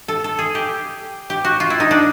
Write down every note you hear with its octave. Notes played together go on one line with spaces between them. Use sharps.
A4
A4
G#4
G4
G4
F#4
F4
E4
D#4
D4